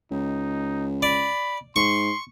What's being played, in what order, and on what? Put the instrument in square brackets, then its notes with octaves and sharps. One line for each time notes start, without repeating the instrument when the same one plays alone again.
[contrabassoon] C#2 [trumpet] D#4
[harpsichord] D5 [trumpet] B5
[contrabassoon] G#2 [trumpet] C6 [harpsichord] C#6